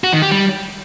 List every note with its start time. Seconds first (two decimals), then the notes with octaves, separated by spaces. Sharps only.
0.04 F#4
0.13 D#3
0.22 G4
0.31 G3